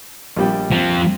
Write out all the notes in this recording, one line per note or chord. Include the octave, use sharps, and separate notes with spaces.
A#1 G3 G5
F3 C4